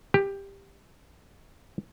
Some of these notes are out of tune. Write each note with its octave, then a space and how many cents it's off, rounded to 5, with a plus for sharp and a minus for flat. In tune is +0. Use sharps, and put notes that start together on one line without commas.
G4 +15